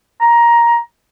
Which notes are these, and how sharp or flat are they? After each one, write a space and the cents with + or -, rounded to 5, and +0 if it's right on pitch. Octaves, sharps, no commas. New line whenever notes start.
A#5 +10